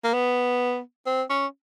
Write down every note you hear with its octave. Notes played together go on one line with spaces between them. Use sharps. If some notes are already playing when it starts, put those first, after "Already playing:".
A#3
B3
C4
C#4